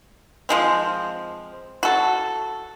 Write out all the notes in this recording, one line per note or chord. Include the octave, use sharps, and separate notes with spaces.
F3 G#3 C4
F#4 A4